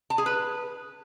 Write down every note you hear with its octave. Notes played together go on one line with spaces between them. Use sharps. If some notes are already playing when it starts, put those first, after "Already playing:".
A5
G#4
B4